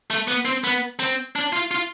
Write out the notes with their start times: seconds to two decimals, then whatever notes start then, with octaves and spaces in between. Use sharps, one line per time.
0.11 A3
0.28 B3
0.45 C4
0.64 B3
0.99 C4
1.36 D4
1.53 F4
1.71 F4